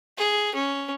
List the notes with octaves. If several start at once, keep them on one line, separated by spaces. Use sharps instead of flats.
G#4
C#4